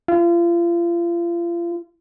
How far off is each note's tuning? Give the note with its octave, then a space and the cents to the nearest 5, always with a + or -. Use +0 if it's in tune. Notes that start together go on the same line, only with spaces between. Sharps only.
F4 -35